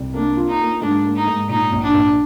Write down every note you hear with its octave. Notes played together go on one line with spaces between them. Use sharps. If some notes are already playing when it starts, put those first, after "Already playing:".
Already playing: C2
A#3 D4
F4
D#4
A#3
G#2 D4
A#3
D#4
G#2
A#2 D#4
A#1
D4
A#1